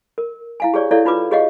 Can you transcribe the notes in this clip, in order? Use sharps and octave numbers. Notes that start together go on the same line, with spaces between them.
A#4
E4 F5 G#5
G4 G#4 C#5 D5
E4 A4 C#5 D5 E5 F5
D#4 F4 B4 D6
G4 G#4 C#5 D#5 F5 F#5